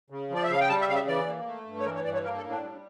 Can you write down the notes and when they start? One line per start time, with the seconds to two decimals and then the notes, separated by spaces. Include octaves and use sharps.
0.10 C#3
0.30 F3 D5
0.43 E5
0.49 C#3 F5
0.60 G5
0.69 G3 A5
0.81 E5
0.88 C#3 F5
0.95 E5
1.07 E3 D5
1.27 A#3
1.46 A3
1.66 G2
1.80 C#5
1.85 E3 A#4
1.95 C#5
2.04 G2 D5
2.14 C#5
2.24 A#3 A#4
2.37 A4
2.44 A2
2.50 D4
2.63 G3